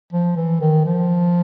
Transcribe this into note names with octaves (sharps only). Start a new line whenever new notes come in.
F3
E3
D#3
F3